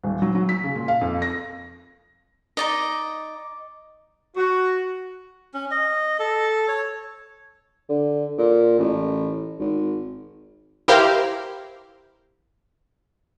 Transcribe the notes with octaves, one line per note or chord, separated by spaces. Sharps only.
D#1
F#3
F#3
B6
C#3
A#2
F5
F2
A#6
D#4 D5 D#5
F#4
C#4
D#5
A4
C#5
D3
A#2
A1
G#1
E4 G4 A#4 C5 F5